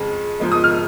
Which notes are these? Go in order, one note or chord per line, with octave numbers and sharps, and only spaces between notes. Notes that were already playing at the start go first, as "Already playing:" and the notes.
Already playing: F2 C#3 G#3
G#2 F3 G#3
D#6
F6